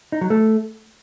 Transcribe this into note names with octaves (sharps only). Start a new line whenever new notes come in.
D#4
F#3
A3